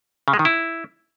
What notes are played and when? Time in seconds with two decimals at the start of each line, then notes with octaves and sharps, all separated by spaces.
0.28 C#3
0.33 G#3
0.39 D#3
0.45 E4